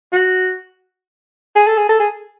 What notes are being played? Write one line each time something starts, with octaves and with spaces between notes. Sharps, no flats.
F#4
G#4
A4
G#4
A4
G#4